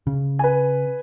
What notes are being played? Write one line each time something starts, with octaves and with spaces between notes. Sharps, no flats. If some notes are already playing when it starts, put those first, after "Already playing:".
C#3
B4 G#5